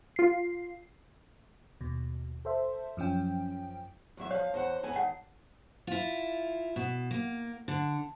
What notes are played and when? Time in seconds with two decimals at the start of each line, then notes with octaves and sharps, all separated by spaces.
0.16 F4 C7
1.81 D#2 B2
2.45 A4 C5 E5
2.97 F#2 F3 C#4 G5
4.17 E2 F#3 E5
4.31 F3 C#5 F5
4.54 E2 C5 F#5
4.83 F2 B3 G#5
4.96 D#3 F#5
5.87 E4 F4
6.76 B2
7.11 A#3
7.68 D3